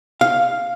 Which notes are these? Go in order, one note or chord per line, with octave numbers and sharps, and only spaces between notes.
F5